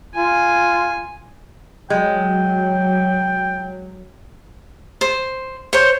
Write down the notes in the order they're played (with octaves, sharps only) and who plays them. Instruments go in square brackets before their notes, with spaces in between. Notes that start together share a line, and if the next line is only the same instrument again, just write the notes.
[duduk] F4 [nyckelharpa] G#5
[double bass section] F#3 [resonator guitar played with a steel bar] G#3 [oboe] G5
[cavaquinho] C5
[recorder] C5 [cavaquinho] C#5 C6